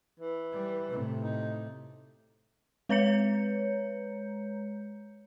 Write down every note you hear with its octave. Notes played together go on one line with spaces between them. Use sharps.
E3
G3
A2 C3
D#4
G#3 B4 C#5 A#5 G6 C#7